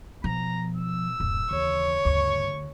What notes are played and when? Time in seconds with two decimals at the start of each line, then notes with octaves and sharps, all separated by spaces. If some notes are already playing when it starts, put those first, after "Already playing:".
0.24 B2 F3 A#5
0.76 E6
1.20 D1 F#2
1.51 D#2 C#3 E3 C#5
2.05 D2 G2 C#3 C#6